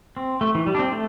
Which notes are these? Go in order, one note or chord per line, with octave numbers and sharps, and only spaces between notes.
C4
A3
E3
G3
D4
C4
A3